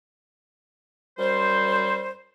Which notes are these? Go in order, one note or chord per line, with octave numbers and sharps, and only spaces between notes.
F#2 G3 C5